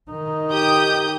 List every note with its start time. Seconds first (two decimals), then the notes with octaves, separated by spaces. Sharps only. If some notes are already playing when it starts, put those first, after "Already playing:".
0.11 D#3 D#4
0.51 G4 D#6 G6